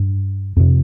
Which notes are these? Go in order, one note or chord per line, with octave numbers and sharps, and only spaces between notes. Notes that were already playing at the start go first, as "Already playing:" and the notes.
Already playing: G2
F2 C3